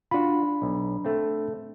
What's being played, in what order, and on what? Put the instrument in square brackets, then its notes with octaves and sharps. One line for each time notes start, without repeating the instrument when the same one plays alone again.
[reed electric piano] D4 B5 [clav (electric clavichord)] F4 F#4
[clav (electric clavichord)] B1
A3 C4